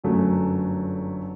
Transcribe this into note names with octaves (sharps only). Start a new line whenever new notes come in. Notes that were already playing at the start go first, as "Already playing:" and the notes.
G1 F#2 F#3 A3